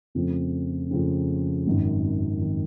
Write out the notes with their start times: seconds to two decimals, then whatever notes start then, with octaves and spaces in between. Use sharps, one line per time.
0.15 F2 C#3 F3 A3 C4
0.91 F2 C#3 F3 A3 C4
1.67 G#1 F#2 D#3
2.41 D#3